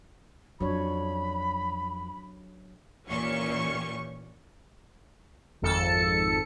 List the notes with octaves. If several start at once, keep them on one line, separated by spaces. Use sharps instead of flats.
F2 F#3 D4 C#5 B5
D#2 A#2 E3 C#4 G4 C#6
G#1 F2 A4 C#7